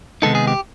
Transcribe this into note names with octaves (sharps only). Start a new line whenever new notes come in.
C3 D#3 G#3 B3 D#4 A4
G#4
G4